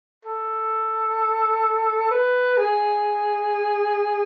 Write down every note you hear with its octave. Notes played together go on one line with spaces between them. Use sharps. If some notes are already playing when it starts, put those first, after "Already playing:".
A4
B4
G#4